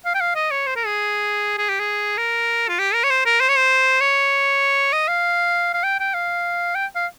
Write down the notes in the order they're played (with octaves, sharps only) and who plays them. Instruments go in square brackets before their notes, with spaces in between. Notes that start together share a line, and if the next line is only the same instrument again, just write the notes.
[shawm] F5
G5
F5
D#5
C#5
C5
A#4
G#4
G#4
G4
G#4
A#4
F4
G4
A#4
C#5
C5
A#4
C5
C#5
C5
C#5
D#5
F5
F5
G5
G5
F5
G5
F5